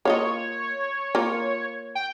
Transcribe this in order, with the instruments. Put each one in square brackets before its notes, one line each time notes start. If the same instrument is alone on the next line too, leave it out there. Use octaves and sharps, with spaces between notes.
[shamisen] A#3 F4 D#5 [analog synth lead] C#5
[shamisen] A#3 F4
[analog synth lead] G5